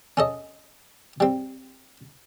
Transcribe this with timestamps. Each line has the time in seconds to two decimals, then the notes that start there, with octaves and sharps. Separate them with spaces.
0.17 C#4 A4 D#5
1.20 G3 C4